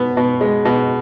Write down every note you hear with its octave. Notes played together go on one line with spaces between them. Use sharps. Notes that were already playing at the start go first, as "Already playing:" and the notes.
Already playing: B2 B3
B2
G#3
B2